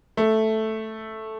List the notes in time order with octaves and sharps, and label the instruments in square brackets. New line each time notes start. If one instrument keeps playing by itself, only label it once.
[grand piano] A3